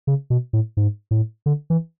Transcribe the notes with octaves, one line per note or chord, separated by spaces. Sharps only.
C#3
B2
A2
G#2
A2
D3
E3